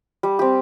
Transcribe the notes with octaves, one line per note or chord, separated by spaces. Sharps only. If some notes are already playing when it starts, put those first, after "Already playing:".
G3
C4 G4